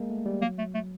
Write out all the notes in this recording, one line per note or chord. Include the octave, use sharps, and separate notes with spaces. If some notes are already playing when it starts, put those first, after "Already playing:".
Already playing: G#3 A#3
A3
G3
F#3 A#3
A3
A3